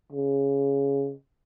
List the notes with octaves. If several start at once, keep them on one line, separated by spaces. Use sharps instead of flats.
C#3